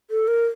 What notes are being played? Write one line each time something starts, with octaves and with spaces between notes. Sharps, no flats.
A4
A#4